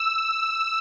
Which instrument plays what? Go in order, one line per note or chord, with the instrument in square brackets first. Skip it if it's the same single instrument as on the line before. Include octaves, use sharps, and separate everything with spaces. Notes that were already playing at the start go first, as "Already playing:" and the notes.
Already playing: [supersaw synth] E6